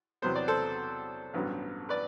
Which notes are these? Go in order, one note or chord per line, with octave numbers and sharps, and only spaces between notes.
E2 C3 F#3 B3 C5
D5
A4 C5
A1 G2 F#3 B3
B4 D5